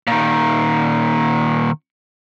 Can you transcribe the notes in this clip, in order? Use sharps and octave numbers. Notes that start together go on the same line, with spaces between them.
A#2 D#3